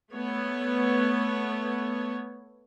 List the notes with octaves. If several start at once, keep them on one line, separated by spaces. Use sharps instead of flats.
A3 B3 C#5